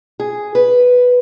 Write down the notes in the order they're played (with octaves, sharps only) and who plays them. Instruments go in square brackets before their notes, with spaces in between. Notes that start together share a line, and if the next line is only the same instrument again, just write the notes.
[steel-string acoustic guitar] G#4
B4